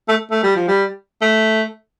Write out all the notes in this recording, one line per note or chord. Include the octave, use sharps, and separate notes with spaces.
A3
A3
G3
F3
G3
A3